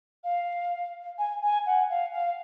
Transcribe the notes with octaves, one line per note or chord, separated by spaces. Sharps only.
F5
G#5
G#5
F#5
F5
F5